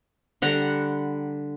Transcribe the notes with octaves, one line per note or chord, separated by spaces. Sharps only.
D3 G3 F#5 A#5